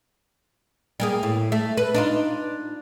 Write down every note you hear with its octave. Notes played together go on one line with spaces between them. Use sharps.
G3 A#3 G#4
A2
A3
B4
D4 D#4 F4